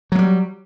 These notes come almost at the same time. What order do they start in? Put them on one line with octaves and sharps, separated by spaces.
F#3 A#3 G3